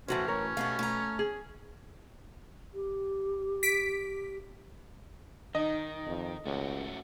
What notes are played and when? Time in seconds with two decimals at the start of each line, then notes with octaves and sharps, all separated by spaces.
0.08 F#2 A2 E3 A3 C#4 F#4 C5
0.28 A#4 C#5
0.57 B2 A3 B3 F#4 G4 F5
0.79 A3 A#5
1.19 G#4
2.74 G4
3.63 B6 D7
5.55 D#3 D#4 D#5
6.06 F2
6.46 C#2 A3 C#4 F#4